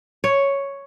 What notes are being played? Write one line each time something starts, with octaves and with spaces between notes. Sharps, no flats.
C#5